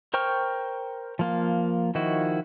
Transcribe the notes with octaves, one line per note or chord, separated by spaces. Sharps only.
A#4 C5 G5 C#6 F6
F3 A#3 F4
D#3 F3 E4 F#4